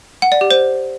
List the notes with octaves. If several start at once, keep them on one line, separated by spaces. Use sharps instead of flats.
F#5
D5
G4
C5